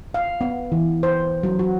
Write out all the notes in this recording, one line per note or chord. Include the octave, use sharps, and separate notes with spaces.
F5
B3
E3
C5
F#3
F#4